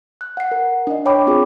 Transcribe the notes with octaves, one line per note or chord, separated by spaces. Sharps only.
F#6
F#5 C7
A#4
D4 D#5
C#5 G5 B5 D6
C4 F4 G#4